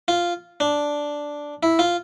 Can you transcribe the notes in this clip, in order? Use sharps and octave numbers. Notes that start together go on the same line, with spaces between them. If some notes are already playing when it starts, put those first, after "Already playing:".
F4
D4
E4
F4